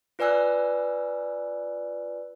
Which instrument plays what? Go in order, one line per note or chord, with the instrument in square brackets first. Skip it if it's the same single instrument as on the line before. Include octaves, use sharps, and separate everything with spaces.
[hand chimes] F4 B4 D5 G#5 E6 F#6